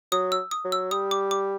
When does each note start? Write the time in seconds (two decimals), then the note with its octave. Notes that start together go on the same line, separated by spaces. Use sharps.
0.12 F#3 D#6
0.32 E6
0.51 D#6
0.65 F#3
0.72 E6
0.91 G3 D#6
1.11 D6
1.31 D6